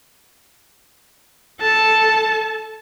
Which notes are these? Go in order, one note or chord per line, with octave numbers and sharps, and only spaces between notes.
A4 A5